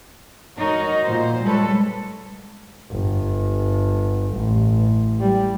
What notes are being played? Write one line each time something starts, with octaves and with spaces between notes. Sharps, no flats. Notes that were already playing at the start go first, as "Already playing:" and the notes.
D#4 F#4 A#4 C#5 D#5
A#2 C5
G3 G#3 A4 B4 C#5
G1
A1
G3